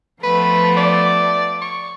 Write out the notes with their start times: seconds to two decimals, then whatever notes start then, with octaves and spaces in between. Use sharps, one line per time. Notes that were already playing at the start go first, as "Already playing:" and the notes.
0.23 F3 A3 B3 B4
0.77 D5
1.62 C#6